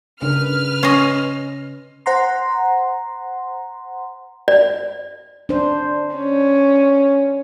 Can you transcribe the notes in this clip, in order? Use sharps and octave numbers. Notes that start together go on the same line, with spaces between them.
G2 C#3 D4 A#4 B4 F6
C#4 D#5 C6 C7 D#7
C5 F#5 A#5 C6
D5
D4 C5
C#4